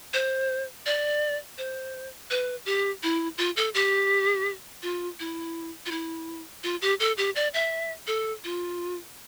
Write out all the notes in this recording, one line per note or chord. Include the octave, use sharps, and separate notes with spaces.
C5
D5
C5
B4
G4
E4
F4
A4
G4
F4
E4
F4
E4
F4
G4
A4
G4
D5
E5
A4
F4